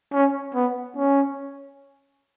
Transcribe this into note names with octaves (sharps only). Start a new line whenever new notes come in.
C#4
B3
C#4